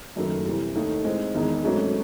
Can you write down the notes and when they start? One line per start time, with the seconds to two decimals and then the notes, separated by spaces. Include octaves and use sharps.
0.16 F#1 F#2 D#3 A3
0.45 C2 C3 E3
0.76 D#2 D#3 A3 D#4
1.04 A2 G#3 C4 D#4
1.35 E1 E2 D#3 G#3 D#4
1.64 G#1 G#2 F#3 A3 C#4